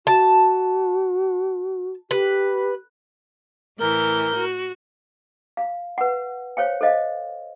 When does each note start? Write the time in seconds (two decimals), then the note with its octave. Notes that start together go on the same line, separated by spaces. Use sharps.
0.07 F#4 A5
2.11 G4 B4
3.80 A2 E3 A#4 G6
4.35 F#4
5.57 F5
5.98 B4 F#5
6.57 C5 C#5 F5 G5
6.81 A4 C5 D#5 F5